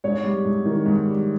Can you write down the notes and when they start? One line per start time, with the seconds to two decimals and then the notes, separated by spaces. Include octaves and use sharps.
0.04 G#2 C#5
0.24 G3
0.45 G#2
0.65 D#3
0.86 G#2
1.06 G3